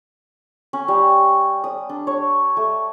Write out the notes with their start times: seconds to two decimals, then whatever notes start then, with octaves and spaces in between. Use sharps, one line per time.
0.73 C#4
0.88 G3
1.64 D#6
1.89 D4
2.07 C#5
2.57 A3